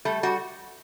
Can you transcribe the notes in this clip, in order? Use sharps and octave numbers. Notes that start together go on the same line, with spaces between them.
G3 A3
G3 F#4